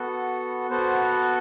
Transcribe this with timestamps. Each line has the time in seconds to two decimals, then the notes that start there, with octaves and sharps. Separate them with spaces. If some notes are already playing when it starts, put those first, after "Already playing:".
Already playing: B3 F#4 A4
0.70 B3 F#4 A4 C5